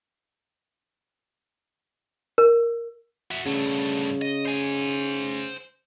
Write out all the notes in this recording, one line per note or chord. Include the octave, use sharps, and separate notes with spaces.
A#4
F#4 E5
G2 C#3 A3
D#5
C5 G#5